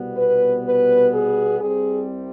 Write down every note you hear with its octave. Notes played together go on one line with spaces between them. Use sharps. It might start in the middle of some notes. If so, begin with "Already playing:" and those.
Already playing: C2 B2 G3 B3
B4
B4
G#4
C2 C3 G3 C4 G#4